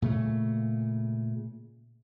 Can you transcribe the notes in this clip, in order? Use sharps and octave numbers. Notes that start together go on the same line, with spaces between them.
A#2 C#3 A3